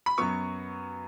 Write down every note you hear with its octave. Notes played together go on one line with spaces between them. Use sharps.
B5
F#2 F#3 B3 C#6